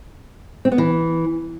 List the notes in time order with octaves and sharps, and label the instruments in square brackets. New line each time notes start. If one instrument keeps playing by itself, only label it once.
[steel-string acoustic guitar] C4
B3
E3